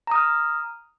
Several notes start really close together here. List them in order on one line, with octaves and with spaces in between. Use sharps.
A#5 D#6 F6